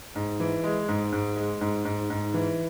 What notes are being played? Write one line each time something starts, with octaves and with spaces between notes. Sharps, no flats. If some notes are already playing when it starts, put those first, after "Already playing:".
G#2
E3
G#3
G#2
G#2
G#3
G#2
G#2
G#2
E3